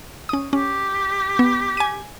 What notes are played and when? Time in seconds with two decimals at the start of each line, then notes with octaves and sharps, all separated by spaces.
0.29 C#4 D#6
0.53 C#4 G4
1.39 B3
1.77 G#5 D#7